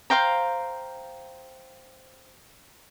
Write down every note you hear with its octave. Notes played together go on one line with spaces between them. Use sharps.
C5 F5 G5 A#5